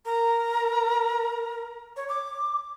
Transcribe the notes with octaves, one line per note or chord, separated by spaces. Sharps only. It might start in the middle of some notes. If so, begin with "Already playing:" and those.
A#4
C#5
D6